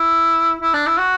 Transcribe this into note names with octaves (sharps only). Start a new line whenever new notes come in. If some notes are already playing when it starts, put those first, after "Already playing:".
Already playing: E4
E4
D4
E4
F#4